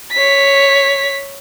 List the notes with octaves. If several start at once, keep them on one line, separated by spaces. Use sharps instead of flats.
C#5 B6